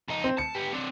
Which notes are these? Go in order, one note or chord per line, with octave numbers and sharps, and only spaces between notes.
F2 D#4
C4
A5 C#7
B3 G4
C4 D4